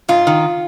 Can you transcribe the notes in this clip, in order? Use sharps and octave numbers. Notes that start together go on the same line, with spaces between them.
G#2 F4
D#3